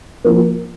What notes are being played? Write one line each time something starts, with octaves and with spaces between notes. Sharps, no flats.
F3 A#3